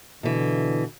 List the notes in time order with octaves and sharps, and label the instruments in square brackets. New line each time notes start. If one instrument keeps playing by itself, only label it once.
[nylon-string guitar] B2 E3 [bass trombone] D3